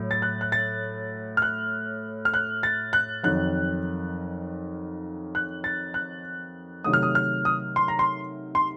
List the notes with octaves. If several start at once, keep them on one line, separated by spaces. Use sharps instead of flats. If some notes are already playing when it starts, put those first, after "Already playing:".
Already playing: A2 F#3 A3
A6
F#6
F#6
A6
F6
F#6
F6
F#6
A6
F#6
F2 D#3 F#3 F#6
F#6
A6
F#6
C3 D#3 F#3 A3 D#6
F6
D#6
F6
D#6
C6
A#5
C6
C6